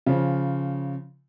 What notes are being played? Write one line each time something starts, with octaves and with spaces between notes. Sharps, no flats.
C#3 F3